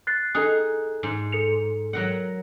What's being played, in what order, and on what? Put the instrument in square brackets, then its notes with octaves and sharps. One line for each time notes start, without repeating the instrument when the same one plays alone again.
[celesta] F#6 A6 C7
[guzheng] D#4 G#4 [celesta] A4 F#6
[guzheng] G#2
[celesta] A4 C#7 F7
[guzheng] F#3 A#4 F#5